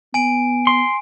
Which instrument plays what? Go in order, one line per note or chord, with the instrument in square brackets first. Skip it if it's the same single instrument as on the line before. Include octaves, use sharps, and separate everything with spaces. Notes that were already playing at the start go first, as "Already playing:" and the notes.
[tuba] B3 [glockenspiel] G#5 D7
[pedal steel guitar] C6